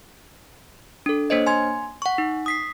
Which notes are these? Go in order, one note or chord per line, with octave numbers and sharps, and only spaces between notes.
D4 A4
A#3 D4 C5 C#5 D#5
G#5 C6 G#6
F#5 C#6
D#4
D#6 B6 C7